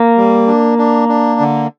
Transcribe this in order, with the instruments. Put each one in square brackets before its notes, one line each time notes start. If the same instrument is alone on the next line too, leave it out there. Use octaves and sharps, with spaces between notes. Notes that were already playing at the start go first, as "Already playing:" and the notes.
Already playing: [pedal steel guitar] A#3
[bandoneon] G3
D4
D4
D4
D3